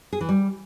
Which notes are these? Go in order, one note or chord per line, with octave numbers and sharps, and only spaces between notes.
G#4
E3
G3